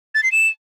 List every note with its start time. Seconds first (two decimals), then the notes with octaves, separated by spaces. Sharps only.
0.15 A6
0.23 C7
0.32 E7